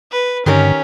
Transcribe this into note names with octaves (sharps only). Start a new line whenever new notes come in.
B4
G2 D3 D#3 C#4 G4 A#4